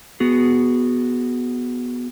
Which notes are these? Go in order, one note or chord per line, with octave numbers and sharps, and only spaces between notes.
B3 F#4 G#4